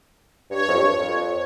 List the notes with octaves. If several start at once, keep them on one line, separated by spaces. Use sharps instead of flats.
G2 C#5
F2
G2
F2